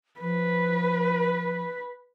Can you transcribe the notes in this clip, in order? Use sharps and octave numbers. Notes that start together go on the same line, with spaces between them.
F3 B4